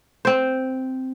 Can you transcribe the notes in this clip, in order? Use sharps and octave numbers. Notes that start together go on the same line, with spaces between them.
C4 C5